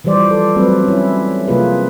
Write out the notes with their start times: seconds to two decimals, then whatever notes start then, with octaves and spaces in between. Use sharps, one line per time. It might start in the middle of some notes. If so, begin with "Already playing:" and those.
0.04 E3 F3 G3 C5 D5
0.29 F3 A4
0.56 F#3 G3 A3 C4 B4
0.84 C#4 E4
1.48 C3 F3 A#3 F4 G#4 B4